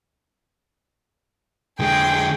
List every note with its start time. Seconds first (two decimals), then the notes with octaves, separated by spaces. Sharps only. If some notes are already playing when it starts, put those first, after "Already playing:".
1.80 D3 G#3 G#4 G5